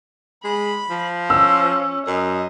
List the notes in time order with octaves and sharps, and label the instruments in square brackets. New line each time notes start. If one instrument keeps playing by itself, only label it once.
[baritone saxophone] G#3 [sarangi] B5
[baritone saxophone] F3
[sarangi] C#4 [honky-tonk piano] E6
[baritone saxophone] F#2 [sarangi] D#5